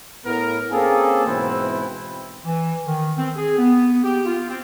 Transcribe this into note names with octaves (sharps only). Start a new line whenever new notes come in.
A2 B3 A#4
A#3 C4 C#4 G#4 A4
G#2 B2 E3 C4 E4 B4
E3
D#3
C4
G#4
B3
G4
F4
C4